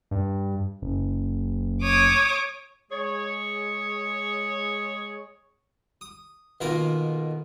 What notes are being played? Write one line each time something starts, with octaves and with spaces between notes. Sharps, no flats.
G2
F#1
C#5 D6 D#6
G#3 G#4 C#5
D#6
B1 D#3 A#3 F4 A#4 B4